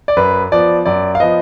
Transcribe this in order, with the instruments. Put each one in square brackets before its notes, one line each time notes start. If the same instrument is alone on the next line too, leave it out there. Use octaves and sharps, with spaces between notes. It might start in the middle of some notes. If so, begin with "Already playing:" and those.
[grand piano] D5
F#2 B4
F3 B3 D5
F#2 D5
F5
F3 B3 D#5